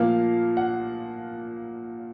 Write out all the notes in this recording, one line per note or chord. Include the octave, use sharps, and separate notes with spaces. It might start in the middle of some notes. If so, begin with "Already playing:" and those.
Already playing: A#2 F3 A#3 F5
F#5